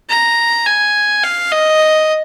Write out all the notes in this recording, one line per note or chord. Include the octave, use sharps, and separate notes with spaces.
A#5
G#5
F5
D#5